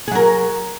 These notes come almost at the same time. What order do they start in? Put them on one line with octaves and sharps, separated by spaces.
G#4 F#3 A#4